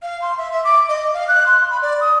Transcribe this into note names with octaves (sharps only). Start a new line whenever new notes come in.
F5
C6
E5
E5
D6
D#5
F5
F#6
C6
B5
D5
D#6